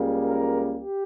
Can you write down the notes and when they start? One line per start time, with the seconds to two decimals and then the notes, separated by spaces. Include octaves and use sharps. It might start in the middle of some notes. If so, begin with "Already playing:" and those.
Already playing: C#2 C#3 G3 A#3
0.25 A#4
0.74 G4